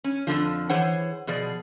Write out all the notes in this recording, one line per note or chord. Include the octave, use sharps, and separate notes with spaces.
C#4
F2 B2 D3 F3
E3 G#4 C5 C#5 F#5
B2 F3 G#4 D5